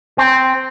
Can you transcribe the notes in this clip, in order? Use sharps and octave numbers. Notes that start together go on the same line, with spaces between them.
C4